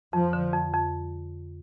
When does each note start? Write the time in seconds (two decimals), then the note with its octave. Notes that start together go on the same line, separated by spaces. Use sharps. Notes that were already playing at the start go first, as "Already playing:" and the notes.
0.13 F2 F3
0.33 D3
0.53 F2
0.74 F2